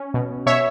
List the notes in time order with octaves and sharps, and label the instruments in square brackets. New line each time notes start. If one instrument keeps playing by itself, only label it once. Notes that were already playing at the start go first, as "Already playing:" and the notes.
Already playing: [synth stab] C#4
B2
B2 C#5 E5